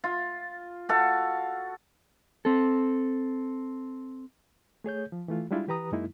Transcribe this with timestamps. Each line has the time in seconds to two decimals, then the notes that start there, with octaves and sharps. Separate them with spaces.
0.04 F4
0.89 F#4 A4 F5
2.45 C4 A4
4.84 A3 G#4 C#5 G6
5.12 F3
5.28 E3 A3 F4
5.51 G3 G#3 D4 E4 F4
5.68 E3 G4 B4 A#5 D#6
5.92 F#2 F#3 G#3 A#3 D#4 E4